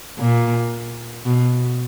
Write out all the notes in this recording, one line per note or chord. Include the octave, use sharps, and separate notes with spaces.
A#2
B2